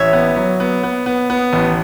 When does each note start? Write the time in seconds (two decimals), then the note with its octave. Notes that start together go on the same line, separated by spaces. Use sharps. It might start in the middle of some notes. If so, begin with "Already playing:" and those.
Already playing: A1 C#5 E5
0.13 B3
0.36 F#3
0.60 B3
0.83 B3
1.06 B3
1.30 B3
1.53 A1